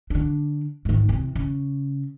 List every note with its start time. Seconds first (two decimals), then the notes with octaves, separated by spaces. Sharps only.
0.10 D3 D4
0.85 G#2 D#3
1.09 E2 C3
1.36 C#3